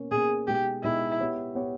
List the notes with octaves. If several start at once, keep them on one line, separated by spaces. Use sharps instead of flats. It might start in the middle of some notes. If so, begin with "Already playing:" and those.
Already playing: B2 A#3 C#4
B2 A#3 C#4 G#4
B2 G#3 D#4 G4 G#4
B2 G#3 D#4 E4 G#4
B3 G4 C#5
B3 G4 C#5